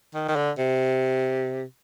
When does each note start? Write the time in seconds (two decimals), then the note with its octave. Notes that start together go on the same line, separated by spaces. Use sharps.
0.15 D#3
0.28 D#3
0.36 D3
0.58 C3